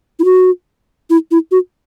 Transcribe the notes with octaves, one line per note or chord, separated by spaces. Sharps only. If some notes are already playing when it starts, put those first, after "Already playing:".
E4
F#4
E4
E4
F#4